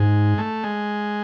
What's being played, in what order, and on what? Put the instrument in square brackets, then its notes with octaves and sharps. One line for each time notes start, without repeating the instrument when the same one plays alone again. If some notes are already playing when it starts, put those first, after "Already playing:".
Already playing: [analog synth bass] G#2 [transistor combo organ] G#3
[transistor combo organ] A3
G#3